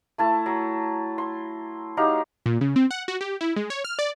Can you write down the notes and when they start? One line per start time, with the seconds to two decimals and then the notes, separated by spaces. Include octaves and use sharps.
0.18 A3 E4 A5
0.46 F#3
1.18 C6
1.97 F#3 D#4 G4 F5
2.46 A#2
2.61 C#3
2.76 C4
2.91 F#5
3.08 F#4
3.21 G4
3.41 E4
3.56 G#3
3.70 C#5
3.85 F6
3.99 D5